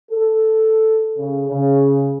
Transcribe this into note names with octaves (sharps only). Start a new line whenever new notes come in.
A4
C#3
C#3